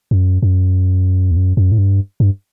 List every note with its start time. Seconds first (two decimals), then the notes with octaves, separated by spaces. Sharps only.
0.11 F#2
0.42 F#2
1.31 E2
1.37 F#2
1.57 F#2
1.72 A2
1.78 G2
2.20 G2